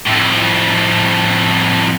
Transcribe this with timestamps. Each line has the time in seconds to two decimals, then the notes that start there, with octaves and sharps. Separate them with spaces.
0.07 F2 A2